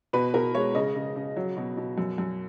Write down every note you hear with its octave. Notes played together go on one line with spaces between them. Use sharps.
B2 B4
B2 A#4
G#3 C#5
C#3 D#5
C#3
C#3
F#3
B2
B2
F#2
F#2